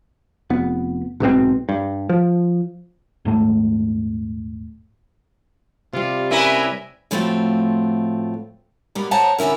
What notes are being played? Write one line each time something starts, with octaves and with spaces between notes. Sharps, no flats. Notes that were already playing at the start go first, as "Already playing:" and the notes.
F1 B3
B1 G#2 B2 C4
G2
F3
D#1 G#2 A3
C3 G3 F4
C#4 E4 A#4 B4 E5 G#5
A2 F3 A3 C4 F4 F#4
B2 G3 A#3 B3
C5 C#5 F#5 A5 A#5
B2 D3 C#4 E4 A#4